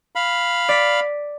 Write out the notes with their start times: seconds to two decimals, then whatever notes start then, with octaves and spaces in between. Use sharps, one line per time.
0.15 F5 B5
0.69 D5 B6